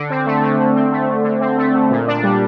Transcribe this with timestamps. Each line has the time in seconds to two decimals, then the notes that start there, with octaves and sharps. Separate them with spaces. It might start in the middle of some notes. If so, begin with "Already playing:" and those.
Already playing: D3
0.10 C4
0.26 A3
0.42 D3
0.59 D3
0.75 C4
0.92 A3
1.08 D3
1.24 D3
1.41 C4
1.58 A3
1.74 D3
1.91 A#2
2.07 D4
2.23 G3